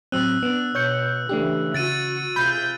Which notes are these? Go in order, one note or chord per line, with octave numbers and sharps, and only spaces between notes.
A2 F#3 C4 E6 F#6
B3 D4
B2 C#5 G6 C#7
C#3 E3 A3 D4 G4
C#3 F#4 A6 D7 D#7
C3 F4 G#4 B5 G6